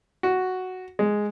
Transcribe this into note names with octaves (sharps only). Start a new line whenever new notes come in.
F#4
G#3